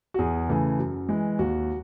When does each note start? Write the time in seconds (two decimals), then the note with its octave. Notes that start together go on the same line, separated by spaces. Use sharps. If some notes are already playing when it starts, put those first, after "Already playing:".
0.14 F#4
0.19 E2 G#4
0.49 C#3 E3 A3
0.79 F#2
1.09 E3 G#3
1.39 D#2 F#4